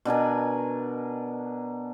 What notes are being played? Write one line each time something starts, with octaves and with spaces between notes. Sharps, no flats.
B2 D4 A#4 G#5